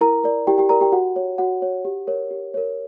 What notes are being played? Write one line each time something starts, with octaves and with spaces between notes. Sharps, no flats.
E4 A#4 A#5
A#4 D5
E4 G4 G5
G4 G5
A#4 D5 A#5
G4 G5
F#4 F#5
C#5
F#4 F#5
C#5
G4
A#4 C#5
G4
A#4 C#5